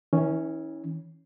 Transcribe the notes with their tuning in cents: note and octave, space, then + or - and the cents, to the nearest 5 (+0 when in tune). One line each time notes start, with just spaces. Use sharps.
E3 -35 C#4 +0